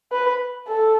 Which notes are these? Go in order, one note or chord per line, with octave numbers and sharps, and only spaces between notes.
B4
A4